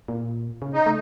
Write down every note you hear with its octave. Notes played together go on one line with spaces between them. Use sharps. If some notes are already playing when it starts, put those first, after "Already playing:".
A#2
C#3
D#4
A3